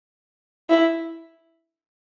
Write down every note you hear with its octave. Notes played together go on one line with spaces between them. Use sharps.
E4